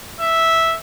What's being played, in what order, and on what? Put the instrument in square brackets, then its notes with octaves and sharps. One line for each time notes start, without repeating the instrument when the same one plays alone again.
[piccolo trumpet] E5